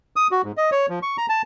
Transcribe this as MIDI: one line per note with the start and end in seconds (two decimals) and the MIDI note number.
0.16 0.27 87
0.31 0.42 66
0.44 0.52 44
0.57 0.70 75
0.72 0.86 73
0.89 0.99 53
1.03 1.17 85
1.18 1.26 82
1.29 1.42 81